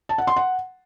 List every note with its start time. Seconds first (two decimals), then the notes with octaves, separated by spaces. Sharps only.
0.09 A5
0.18 F#5
0.27 C6
0.36 F#5